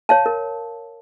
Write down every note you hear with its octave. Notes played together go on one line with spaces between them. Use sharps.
C#5 F5 A5
A#4